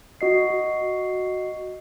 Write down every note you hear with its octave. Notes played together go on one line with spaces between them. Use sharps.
F#4 D#5 C7